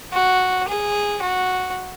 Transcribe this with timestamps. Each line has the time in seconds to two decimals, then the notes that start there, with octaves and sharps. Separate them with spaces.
0.13 F#4
0.68 G#4
1.22 F#4